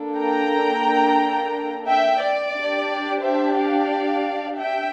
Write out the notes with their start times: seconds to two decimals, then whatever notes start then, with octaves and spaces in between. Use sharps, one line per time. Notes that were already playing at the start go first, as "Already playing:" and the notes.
Already playing: A#3 D4 A4
0.17 G5 A#5
1.86 E5 G5
2.21 D5
2.55 D4 G4
3.22 C5 E5
3.56 D5 F5
4.58 E5 G5